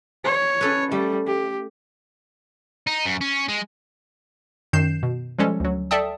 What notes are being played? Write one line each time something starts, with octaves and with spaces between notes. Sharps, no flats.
C#5
C#4 A4 B4
G3 A3
G4
D#4
F#2
C#4
G#3
F#2 D#3 G6 C7 E7
B2
F3 G3 G#3 C#4 A4
D2 F#3
A4 D5 E5 G5 A5 D#6